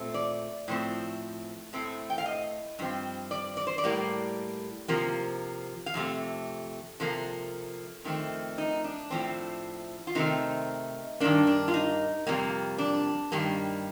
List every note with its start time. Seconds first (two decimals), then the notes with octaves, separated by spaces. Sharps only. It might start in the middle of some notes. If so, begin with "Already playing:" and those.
Already playing: A#2 A3 C4
0.14 D5
0.68 A2 F3 A3 C4
1.73 A2 A3 C4
2.10 G5
2.18 F5
2.26 D#5
2.79 G2 F3 C4
3.31 D5
3.57 D5
3.67 C5
3.78 D5
3.84 A2 G3 A#3
4.88 C3 F3 A#3
5.86 F5
5.94 F2 C3 A3
7.00 C3 F3 A#3 A4
8.04 F2 D#3 A3 C4
8.58 D#4
8.84 D4
9.10 A2 F3 A3 C4
10.07 F4
10.15 C3 D#3 A3 C4 D#4
11.20 G2 D#3 A#3 D4
11.47 D4
11.68 F4
11.74 D#4
12.27 F2 C3 G3 A#3
12.78 D4
13.32 G2 D#3 G3 A#3